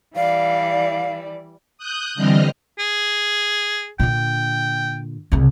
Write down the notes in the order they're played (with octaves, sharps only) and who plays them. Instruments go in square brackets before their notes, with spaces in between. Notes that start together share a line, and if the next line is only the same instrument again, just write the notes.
[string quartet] E3 G3 D5 [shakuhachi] F5
[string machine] D#6 F#6 G6
D3 E3 G3 C4 D#5 F6
[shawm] G#4
[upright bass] A#2 D3 [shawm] G5
[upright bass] C2 C#3